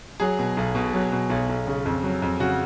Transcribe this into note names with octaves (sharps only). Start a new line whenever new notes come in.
F#3 G#4
B2
B1
B2
F#3
B2
B1
B1
C#3
F2
F#3
F2
C#3 F#4